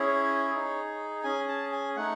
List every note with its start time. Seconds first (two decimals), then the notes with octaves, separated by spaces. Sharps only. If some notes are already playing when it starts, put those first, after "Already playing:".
Already playing: C#4 E4 G#4 C#5
0.51 D#4 G#4
1.24 C#4 G#4 G#5
1.48 A5
1.72 G#5
1.96 A3 D#4 F#5